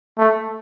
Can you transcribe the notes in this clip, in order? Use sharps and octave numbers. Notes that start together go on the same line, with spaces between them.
A3